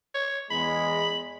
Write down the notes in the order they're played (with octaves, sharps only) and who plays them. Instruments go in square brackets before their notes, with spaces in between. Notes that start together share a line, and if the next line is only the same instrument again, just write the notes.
[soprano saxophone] C#5
[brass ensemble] E2 G#3 [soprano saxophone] B5